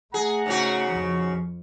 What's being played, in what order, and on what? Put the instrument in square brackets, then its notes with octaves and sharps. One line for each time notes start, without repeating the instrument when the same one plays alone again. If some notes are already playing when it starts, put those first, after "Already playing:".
[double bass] A3 [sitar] G#4 [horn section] F#5 A#5
[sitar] G#2 C#3 F#4
[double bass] F2 F3